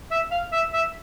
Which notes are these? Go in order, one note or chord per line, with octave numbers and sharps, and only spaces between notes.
E5
F5
E5
E5